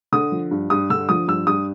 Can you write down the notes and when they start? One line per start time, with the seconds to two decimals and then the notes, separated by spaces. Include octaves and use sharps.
0.12 D3 D#6
0.32 F3
0.51 G2
0.70 G2 D#6
0.90 D3 E6
1.09 F3 D#6
1.28 G2 E6
1.47 G2 D#6